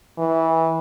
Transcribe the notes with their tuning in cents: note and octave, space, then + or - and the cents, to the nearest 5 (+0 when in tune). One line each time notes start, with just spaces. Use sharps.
E3 -20